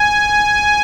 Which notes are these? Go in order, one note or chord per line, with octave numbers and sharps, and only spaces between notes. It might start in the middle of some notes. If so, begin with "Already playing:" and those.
Already playing: G#5